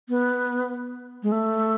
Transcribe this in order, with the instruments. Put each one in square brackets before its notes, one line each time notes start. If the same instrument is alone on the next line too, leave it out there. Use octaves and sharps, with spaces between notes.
[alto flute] B3
G#3
A3